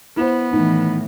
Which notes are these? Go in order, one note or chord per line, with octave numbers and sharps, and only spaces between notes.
B3 E4 C5
A2 D#3 E3 D#4